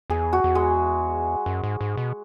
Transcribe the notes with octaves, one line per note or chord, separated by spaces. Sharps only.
E2 G#4
F#4
E2
G#3
F#2
G#2
G#2
B2